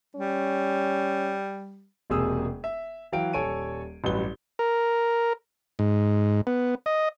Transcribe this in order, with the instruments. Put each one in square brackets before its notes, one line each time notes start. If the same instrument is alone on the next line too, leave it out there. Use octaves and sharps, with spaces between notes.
[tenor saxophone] G3 [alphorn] C#4
[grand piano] E1 C3 A#3 G#4 D#6 E6
E5
E3 F#3 F5 G5 D7
D#1 A4 C#5 G#5 D7 D#7
A1 G2 F#3 B4 G7
[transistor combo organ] A#4
G#2
B3
D#5